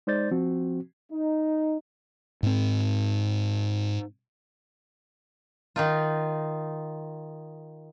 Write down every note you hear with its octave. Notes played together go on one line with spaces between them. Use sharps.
G#3 D#4 C5 D5 G6 A6
F3 C4 F#4
D#4
G#2 C4
D#3 D#4 F4